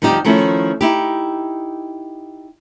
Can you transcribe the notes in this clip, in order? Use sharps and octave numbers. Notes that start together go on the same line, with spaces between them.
D2 F3 G3 D#4 G4
D#3 F3 A3 C#4 E4
D#4 E4 G4